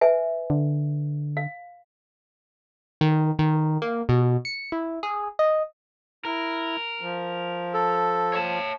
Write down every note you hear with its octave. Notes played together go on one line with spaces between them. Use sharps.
B4 E5 G#5
D3
F5
D#3
D#3
A#3
B2
C#7
E4
G#4
D#5
E4 A#4
F3
A4
C#5 A5